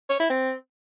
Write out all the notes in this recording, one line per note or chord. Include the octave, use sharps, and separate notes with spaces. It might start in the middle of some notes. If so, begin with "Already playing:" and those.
C#5
E4
C4